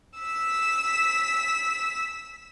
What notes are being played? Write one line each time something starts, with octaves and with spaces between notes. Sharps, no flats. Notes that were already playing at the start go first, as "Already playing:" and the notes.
E6 B6